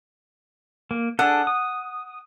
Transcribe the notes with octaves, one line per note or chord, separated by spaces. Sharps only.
A#3
D4 G#4 A4 F#5
D#6